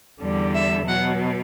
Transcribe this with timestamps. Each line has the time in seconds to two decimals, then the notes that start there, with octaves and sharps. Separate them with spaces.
0.22 E2 D3 G3
0.55 E5
0.87 B2 F#3 F#5